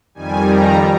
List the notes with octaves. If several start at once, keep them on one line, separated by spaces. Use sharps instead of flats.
F2 D#3 G3 G#5
A#5